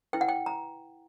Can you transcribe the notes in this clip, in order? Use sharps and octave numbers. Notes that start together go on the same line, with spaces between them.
E4 B4 G5
F#5
G5
A#5